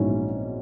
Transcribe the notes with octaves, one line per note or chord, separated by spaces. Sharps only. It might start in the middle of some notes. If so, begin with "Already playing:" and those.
Already playing: A#1 G#2 F#3 C#4 E4